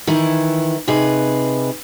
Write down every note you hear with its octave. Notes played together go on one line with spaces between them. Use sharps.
D#3 E3 E4
C3 D#4 G#4 B4